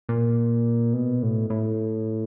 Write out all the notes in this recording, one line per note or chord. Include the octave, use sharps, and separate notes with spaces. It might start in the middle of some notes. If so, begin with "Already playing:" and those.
A#2
B2
A2
A2